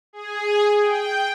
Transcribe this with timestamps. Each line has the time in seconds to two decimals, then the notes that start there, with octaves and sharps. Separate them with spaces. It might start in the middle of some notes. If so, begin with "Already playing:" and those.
0.13 G#4
0.80 G5